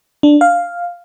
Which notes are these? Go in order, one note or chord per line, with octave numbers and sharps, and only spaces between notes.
D4
F5